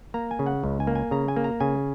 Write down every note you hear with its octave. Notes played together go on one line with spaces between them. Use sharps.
A#3 A#5
G#5
C#3
F#5
C#2
G#5
A#3
G#5
C#3 A#5
G#5
A#3
A#5
C#3 G#5